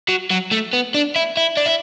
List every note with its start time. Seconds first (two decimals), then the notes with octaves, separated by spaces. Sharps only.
0.08 F#3
0.30 F#3
0.51 A3
0.73 B3
0.94 D4
1.16 E4
1.37 E4
1.57 D4
1.66 E4